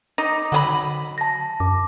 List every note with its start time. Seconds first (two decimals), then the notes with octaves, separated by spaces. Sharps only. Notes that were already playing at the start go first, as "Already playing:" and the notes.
0.18 D#4 D6 A#6
0.52 D3 F#3 G#4 B5
1.18 A5 A#6
1.60 F#2 D6